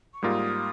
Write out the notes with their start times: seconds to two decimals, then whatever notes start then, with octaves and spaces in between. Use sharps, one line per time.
0.14 C#6
0.22 G#2 G3 A#3 F4 A#4 D#6